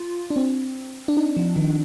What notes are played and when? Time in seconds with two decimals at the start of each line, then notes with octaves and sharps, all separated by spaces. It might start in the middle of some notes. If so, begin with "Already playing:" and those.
Already playing: F4
0.30 D4
0.36 C4
1.08 D4
1.17 D#4
1.37 F3
1.56 D#3